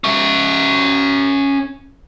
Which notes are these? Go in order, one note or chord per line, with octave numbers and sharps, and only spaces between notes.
C#4 E5